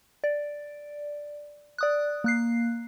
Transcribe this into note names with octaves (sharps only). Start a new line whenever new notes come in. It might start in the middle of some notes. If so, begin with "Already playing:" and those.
D5
D5 D#6 F#6
A#3 F#6 C7